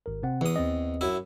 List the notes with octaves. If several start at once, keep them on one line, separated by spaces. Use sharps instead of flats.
G#1 A#4
C3 C4 F#5
E2 E3 D#6
D#2 C4 D#5
F#2 E4